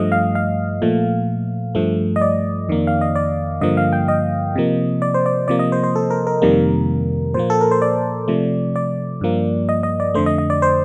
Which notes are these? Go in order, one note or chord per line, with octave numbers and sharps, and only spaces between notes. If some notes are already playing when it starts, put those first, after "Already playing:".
Already playing: G2 F3 A3 D#5
F5
F5
A#2 F3 A3
G2 F3 A3
D#5
D5
F2 D#3 A#3
F5
D#5
D5
G2 D3 F3 A#3 D#5
F5
G5
D#5
C3 F3 A#3
D5
C5
D5
C3 F3 A#3 D5
D#5
C5
C5
A4
A#4
A#4
F2 C3 D#3 G3 A#3
A#2 F3 A#3 C5
A4
A#4
C5
D5
C3 F3 A3
D5
G2 F3 A#3
D#5
D#5
D5
F2 D3 A3 C5
D#5
D#5
D5
C5